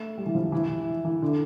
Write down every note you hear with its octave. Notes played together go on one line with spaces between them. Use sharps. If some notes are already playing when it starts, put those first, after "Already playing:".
Already playing: A3
G3
E3
F3
E3
E3
D3